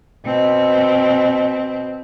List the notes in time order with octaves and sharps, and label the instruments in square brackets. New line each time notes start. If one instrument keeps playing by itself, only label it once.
[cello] B2 C4